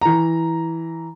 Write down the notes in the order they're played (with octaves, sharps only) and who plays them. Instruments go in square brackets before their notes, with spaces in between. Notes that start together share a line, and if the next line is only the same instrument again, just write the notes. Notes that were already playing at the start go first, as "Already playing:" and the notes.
[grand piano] E3 A#5